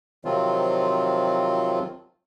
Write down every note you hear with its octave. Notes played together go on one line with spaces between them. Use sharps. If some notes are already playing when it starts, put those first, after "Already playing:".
C3 D#3 F3 F#3 C4 F4